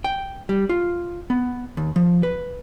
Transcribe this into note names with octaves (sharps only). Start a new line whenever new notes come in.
G5
G3
F4
B3
D#2
F3
B4